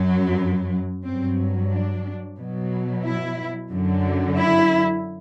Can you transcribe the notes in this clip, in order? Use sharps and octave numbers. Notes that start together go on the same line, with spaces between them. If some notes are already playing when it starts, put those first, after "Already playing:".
Already playing: F#2 F#3
G2 F#3 C4
D4
B2 F#3
E4
F#2 D3 F#3
E4